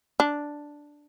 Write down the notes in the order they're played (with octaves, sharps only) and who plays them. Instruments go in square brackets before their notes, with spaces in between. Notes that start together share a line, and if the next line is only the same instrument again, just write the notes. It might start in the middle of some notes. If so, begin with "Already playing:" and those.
[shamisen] D4